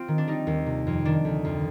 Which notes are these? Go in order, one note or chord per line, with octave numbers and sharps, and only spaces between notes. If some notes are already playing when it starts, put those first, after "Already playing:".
Already playing: C4 F4
D#3
D4
G3 D#4
D#2
C3
F2
D#3 D4
D2
F2